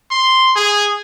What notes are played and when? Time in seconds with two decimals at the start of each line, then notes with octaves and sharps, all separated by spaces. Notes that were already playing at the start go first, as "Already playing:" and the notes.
0.11 C6
0.56 G#4